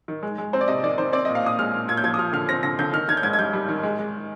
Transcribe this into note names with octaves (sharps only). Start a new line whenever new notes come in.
D#3
G#3
G#3
C4 C5
D5
C3 D#5
D#3 D5
D#3 C5
C4 D5
D#5
A#2
F5
A#2 D#6
G#3 F6
A#2
A#2 G#6
G6
F3 G#6
D#6
F3 F6
D3 F6
C4 A#6
D3 A#6
D3 G6
D#3 F6
D#3 G#6
G6
G#2 G#6
G#6
G3 G6
G3
D#3
G#3
G#3